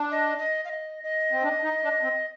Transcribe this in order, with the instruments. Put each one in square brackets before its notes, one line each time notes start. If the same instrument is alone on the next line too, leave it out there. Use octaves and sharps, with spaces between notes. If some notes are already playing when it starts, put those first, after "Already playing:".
Already playing: [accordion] D4
[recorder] D#5
D#5
F5
D#5
D#5
[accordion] C4
D4
D#4
D4
C4